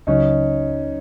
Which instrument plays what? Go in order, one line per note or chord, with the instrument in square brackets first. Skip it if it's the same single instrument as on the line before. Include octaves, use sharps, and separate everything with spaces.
[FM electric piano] C#2 C#3 F#3 [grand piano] C#4 D#4